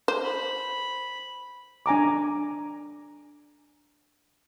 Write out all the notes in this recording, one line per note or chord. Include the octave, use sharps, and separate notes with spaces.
C5
B5
D4 G#5 A#5 D6